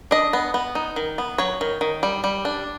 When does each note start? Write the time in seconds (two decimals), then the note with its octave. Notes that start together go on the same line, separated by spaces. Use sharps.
0.11 D4 D#5
0.33 B3
0.54 B3
0.75 D#4
0.96 D#3
1.18 B3
1.38 F#3 C#5
1.61 D#3
1.81 D#3
2.03 G3
2.24 G3
2.45 D4